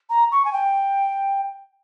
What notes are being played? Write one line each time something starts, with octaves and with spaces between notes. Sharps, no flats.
A#5
C#6
G#5
G5